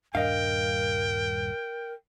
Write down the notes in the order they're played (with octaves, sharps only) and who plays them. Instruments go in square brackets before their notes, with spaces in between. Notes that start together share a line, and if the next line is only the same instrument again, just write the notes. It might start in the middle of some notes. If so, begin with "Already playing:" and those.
[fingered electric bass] D#1 G2 D4 [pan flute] A#4 [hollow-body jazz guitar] D#5 F5 [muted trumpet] G5